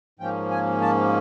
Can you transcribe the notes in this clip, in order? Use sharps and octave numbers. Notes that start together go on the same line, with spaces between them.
G#2 F3 A#3 C#4 G5
G#5
A5